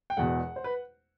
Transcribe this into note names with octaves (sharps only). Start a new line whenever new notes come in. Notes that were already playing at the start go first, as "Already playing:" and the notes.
G5
E1 E2 B2 F#5
C5
B4